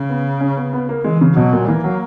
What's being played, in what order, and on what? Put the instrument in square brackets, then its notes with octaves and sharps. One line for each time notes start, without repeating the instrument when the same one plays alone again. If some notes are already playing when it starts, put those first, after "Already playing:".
Already playing: [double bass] C#3
[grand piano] B3
C#4
B3
B3
A#3
[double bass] E3 [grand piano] G#3
[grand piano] C#3
[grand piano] B2 [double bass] F#3
[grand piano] A#2
[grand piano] E3 [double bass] A#3
[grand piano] F#3